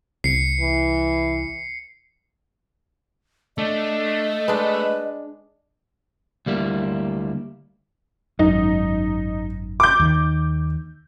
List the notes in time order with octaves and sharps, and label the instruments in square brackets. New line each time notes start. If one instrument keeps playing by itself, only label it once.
[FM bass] C2 [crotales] C7 C#7
[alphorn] E3
[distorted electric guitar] A3 [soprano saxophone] D4 [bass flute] D#5
[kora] G#3 D4 [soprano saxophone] B4
[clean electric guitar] D2 G3 A#3 E4
[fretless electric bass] G#1 F#2 [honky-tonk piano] D#4
[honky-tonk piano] D6 G6
[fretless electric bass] D#2 D#3